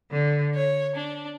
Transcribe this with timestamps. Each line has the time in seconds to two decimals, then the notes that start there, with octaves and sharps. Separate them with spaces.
0.10 D3
0.54 C#5
0.95 D4